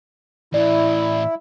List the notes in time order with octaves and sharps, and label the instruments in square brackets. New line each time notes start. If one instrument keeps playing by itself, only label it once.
[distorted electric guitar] A2 E3 [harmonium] E4 [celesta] D5